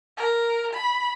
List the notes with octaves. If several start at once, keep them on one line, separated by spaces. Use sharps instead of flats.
A#4
B5